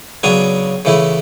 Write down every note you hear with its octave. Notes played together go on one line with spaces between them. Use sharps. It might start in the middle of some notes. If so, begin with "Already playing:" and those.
C#3 F#3 B3 D4 G#5
C#3 E3 A3 E4